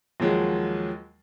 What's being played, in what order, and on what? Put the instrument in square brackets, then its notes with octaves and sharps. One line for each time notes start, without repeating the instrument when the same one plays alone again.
[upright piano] D#2 F3 F#3 G#3